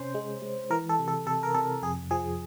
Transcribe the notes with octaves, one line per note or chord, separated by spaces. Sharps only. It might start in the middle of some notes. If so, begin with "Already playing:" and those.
Already playing: C3 C#4 C5
G#3
G#3
E3 A#4
A4
C3
A4
C3 A4
A#4
C3 A4
F2 G#4
F3 G#4